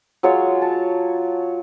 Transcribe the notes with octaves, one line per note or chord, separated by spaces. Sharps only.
F#3 G#3 F4 C#5
A5